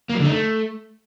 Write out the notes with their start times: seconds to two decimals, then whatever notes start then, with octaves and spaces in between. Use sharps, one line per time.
0.09 A#3
0.15 F#3
0.20 D3
0.25 D#4
0.31 A3